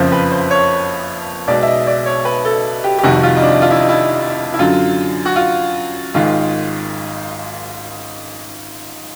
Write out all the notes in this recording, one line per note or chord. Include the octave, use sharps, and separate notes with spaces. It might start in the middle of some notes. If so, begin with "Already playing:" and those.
Already playing: F#1 F2 C#3 F3 C5
B4
C5
C#5
B1 B2 G#3 D5
E5
D#5
D5
C#5
B4
A4
G4
G4
F1 F2 C3 D#3 G3 F#4
F4
D#4
D4
F4
E4
D#4
E4
E4
F#2 D3 F#3 F4
F#4
F4
G#1 G#2 D#3 G#3 F4